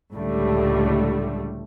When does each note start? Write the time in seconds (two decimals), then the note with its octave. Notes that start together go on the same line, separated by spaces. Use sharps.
0.14 C#2 A2 D3 G3 A3